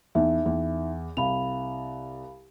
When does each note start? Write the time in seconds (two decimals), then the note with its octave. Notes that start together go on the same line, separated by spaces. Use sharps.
0.15 E2 D#4 E5
0.46 E2
1.17 C2 F5 B5 F7